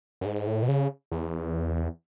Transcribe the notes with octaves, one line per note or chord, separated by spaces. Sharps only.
F#2
G#2
A2
B2
C#3
E2